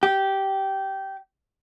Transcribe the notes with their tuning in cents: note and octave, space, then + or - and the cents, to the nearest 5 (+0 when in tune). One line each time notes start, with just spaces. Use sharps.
G4 -15